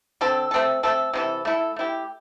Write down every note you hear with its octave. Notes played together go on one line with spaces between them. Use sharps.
D3 C4 A4
A3 C4 A4
A3 C4 A4
C3 E3 C4 A4
A3 E4 A4
A3 E4 G4